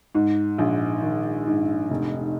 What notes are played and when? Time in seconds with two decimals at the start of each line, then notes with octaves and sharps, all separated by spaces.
0.15 G#2
0.58 A#1
1.02 D#3
1.47 G#2
1.90 F1